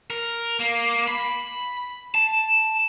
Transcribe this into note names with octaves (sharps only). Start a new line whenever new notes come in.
A#4
A#3
B5
A5